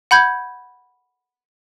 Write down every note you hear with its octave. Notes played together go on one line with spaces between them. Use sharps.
F#5 B5 G6 G#6